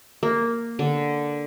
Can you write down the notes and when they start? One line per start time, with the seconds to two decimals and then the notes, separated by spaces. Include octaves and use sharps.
0.23 A#3
0.79 D3